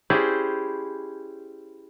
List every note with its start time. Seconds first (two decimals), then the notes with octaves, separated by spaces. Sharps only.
0.10 C#4 E4 G4 G#4 C5 D5